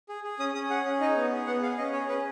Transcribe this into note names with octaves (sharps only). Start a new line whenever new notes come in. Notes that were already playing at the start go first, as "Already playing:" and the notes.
G#4
G#4
C#4 D#6
C#4 D#6
G#4 F#5
C#4
D#4 D#5
B3
G#4
B3 F#5
G#4 F5
C#4 D#5
G#4 C#5
C#4 B4